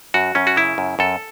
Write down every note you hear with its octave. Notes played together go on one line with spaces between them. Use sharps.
F#2 F#4
F#2 C#4
F#4
C#3 E4
F#2
F#2 A4